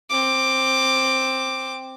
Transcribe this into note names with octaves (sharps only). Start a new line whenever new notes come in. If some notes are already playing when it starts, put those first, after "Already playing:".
C4 D6